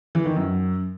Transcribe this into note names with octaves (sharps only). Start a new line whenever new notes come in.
E3
D#3
F#2